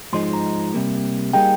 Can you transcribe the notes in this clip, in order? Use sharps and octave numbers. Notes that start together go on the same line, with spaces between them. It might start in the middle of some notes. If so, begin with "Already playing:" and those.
G#2 F3 G#3 D#4 C6
C6
A#5
C3 G3 A#3
G3 A#3 D#4 G#4 G5